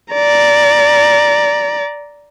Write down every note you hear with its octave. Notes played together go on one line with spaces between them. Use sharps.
D5 A#5